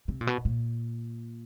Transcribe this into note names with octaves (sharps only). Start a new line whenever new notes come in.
C3
A#2
B2
A#2